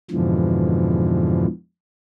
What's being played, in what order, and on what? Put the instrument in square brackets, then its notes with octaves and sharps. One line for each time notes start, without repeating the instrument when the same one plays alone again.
[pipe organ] F2 G#2 B2 D3 E3 F3